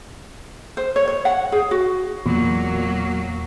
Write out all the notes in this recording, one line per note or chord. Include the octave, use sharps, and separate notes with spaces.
C5
C#5
C#5
F#5
G#4
F#4
E2 A#2 F#3 A#3